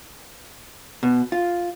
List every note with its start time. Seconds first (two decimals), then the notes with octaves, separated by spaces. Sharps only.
1.03 B2
1.32 F4